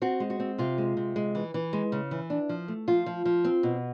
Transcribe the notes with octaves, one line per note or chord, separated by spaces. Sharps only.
C4 F#4
G#3
F#4
C4
C3 F4
G#3
C3
G#3
E3
E3
G#3
C#3
E3
D4
F3
A3
F3 F4
F3
F3
C4
B2